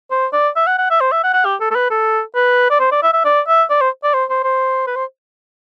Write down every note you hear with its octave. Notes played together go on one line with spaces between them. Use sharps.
C5
D5
E5
F#5
F#5
E5
C5
E5
F#5
F#5
G4
A4
A4
B4
A4
B4
D5
C5
D5
E5
E5
D5
E5
D5
C5
D5
C5
C5
C5
B4
C5